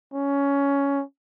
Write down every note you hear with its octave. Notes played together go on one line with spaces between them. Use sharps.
C#4